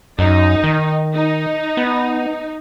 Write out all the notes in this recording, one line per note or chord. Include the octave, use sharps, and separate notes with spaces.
F#2 D#4
D#3
D#4
B3